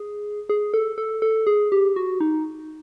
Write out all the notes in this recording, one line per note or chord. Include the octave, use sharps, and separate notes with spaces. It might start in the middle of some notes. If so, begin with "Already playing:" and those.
Already playing: G#4
G#4
A4
A4
A4
G#4
G4
F#4
D#4